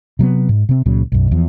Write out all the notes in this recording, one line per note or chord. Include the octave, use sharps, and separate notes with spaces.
C3 F#3 G#3 B3
G#2
C3 C4
C#2 A#2 C#3 F#3
B1 F#2
E2 F3